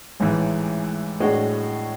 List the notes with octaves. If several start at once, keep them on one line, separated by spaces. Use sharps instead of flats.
A1 G#2 E3
A2 G#3 D4 F#4